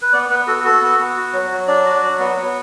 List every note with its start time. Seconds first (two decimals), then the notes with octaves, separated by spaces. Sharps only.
0.02 B4
0.13 B3 D5
0.30 B3 B4
0.47 F#4 A4
0.64 F#4 A4
0.82 B3
0.99 B3
1.16 F#4
1.33 F#3
1.51 F#3
1.67 D4 D5
1.85 F#4
2.02 F#3
2.19 B3
2.37 B3